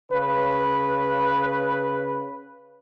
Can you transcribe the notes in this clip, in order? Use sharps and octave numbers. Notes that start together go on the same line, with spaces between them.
C#3 B4